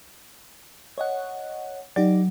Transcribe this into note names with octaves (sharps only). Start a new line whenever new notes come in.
C#5 D#5 F#5
F#3 D#4 G4 D5